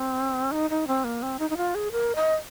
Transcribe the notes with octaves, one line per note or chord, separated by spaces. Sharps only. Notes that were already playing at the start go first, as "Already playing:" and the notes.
Already playing: C4
D#4
D#4
C4
A#3
C4
D#4
D#4
F4
G#4
A#4
D#5